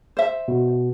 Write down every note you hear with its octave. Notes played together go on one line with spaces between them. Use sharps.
C5 E5
B2